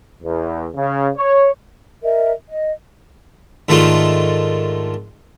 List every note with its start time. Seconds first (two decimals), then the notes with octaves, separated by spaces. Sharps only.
0.22 E2
0.76 C#3
1.15 C#5
2.03 A#4 D#5 E5
2.49 D#5
3.69 G#2 D#3 A3 D4 F4